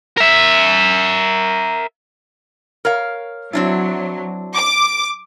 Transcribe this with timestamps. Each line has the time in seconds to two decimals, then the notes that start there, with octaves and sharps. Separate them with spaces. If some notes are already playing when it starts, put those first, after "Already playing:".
0.17 A#4 E5
2.85 A#4 C#5 F5
3.53 F#3 C4 D4 E4
4.56 D6